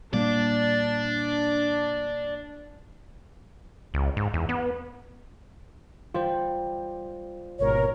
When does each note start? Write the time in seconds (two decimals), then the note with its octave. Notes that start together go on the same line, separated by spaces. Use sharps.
0.13 A#2 G3 A#3 D4 D5
3.94 C#2
4.17 G#2
4.34 E2
4.49 B3
6.14 G3 F4 C5
7.59 G#1 B2 A#4 C#5